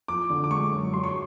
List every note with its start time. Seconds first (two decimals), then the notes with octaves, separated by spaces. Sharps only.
0.08 F3 D6
0.30 D3
0.44 D6
0.50 G#3 C#6
0.71 F#2
0.93 F#3 C6
1.04 C#6